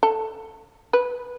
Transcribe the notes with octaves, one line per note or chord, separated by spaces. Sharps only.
A4
B4